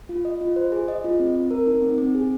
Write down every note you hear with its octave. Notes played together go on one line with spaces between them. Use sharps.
F4
D#5
F4
C5
G#4
D#5
F4
C4
C4
A#4
D#4
C4
C4
G#4